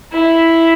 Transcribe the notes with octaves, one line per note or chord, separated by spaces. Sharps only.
E4